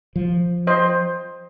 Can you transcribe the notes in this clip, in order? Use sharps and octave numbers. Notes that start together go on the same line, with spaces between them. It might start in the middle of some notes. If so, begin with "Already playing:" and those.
F3
C5 D#5